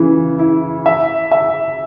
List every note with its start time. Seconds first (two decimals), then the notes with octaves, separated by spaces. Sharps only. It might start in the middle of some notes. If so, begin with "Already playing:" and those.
Already playing: C#3 E3
0.39 E4
0.86 E5
1.31 E5